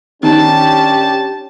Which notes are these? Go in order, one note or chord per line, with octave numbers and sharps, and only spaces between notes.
D#3 C#4 D4 G4 A5